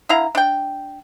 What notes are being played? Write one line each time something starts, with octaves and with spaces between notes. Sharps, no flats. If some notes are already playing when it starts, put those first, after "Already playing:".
D3 E4 F5 A#5
D4 G5